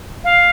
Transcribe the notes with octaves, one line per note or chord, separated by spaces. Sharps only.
F5